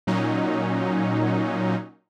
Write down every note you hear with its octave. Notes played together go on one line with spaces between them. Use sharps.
A#2 F#3 C#4 D#4